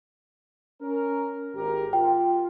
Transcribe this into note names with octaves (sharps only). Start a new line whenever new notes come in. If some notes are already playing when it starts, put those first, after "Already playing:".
C#4 A#4
G#1 G4 A#4
F4 G5